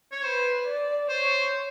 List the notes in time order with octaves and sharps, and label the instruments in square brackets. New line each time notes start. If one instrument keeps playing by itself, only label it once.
[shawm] C#5
[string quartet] B4 [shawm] C5
[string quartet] D5
[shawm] C5 [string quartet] C#5